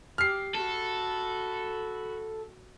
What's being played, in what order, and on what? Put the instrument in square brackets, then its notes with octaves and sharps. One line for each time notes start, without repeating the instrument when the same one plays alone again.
[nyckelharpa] G4 [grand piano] F6 C7
[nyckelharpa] F#4 B5 [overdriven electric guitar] A4